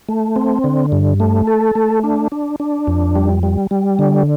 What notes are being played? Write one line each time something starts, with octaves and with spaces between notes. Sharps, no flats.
A3
C4
D3
G2
A3
A4
A3
D4
D4
D4
F2
G3
G3
G3
D3